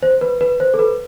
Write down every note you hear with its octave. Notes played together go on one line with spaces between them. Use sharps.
C5
B4
B4
C5
A4
B4